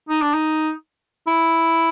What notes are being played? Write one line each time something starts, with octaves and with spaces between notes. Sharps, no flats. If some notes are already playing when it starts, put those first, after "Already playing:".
D#4
D4
D#4
E4